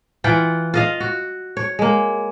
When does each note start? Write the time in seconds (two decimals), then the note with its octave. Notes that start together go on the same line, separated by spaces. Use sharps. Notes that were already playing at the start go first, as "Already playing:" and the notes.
0.24 E3 F4 F#5 G5
0.74 F4 D#5 F5
1.00 F#4
1.57 C#5
1.79 G#3 A#3